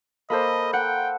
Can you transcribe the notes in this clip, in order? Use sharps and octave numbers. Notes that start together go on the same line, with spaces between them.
A#3 A4 C5 D#5 B5
F#5 G5